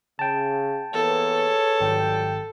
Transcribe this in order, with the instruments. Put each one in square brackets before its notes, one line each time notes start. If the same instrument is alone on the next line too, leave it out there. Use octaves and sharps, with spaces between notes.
[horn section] C#3 [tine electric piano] G5 A5
[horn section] E3 A#3 B3 [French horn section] G#4 B4 C#5 [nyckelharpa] A4
[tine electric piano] G#1 [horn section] F#3 G3 G5